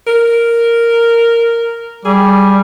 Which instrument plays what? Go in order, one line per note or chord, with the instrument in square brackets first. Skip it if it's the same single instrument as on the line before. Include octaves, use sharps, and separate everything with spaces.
[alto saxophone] A#4
[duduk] G3 [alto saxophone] G#4